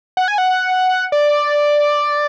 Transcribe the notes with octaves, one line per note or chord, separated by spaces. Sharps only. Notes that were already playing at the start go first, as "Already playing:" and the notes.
F#5
G#5
F#5
D5